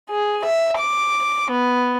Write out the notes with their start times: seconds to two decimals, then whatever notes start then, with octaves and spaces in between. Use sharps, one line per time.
0.11 G#4
0.45 E5
0.78 D6
1.52 B3